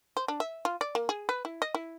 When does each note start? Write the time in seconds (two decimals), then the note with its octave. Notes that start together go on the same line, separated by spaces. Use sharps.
0.17 C5
0.28 D4
0.40 E5
0.65 F4
0.81 D5
0.95 A#3
1.09 G#4
1.29 B4
1.45 E4
1.62 D#5
1.75 E4